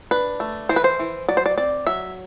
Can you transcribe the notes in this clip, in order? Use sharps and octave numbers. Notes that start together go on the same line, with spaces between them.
D4 B4
A3
E3 C5
B4
C5
E3
F#3 D5
C5
D5
C4 D5
F#3 E5